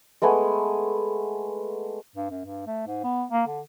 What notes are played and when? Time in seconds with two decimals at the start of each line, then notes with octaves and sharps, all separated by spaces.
0.22 G#3 A3 B3 G#5
2.16 G2
2.30 F#2
2.45 G2
2.67 A3
2.87 G#2
3.04 B3
3.31 A#3
3.47 D3